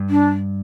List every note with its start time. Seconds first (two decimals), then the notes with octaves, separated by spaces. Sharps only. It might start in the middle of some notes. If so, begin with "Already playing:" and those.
Already playing: G2
0.09 D4